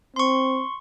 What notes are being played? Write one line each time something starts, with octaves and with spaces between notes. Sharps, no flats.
C4 C6 C#6